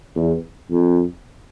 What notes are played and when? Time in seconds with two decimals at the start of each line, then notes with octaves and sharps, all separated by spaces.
0.16 E2
0.70 F2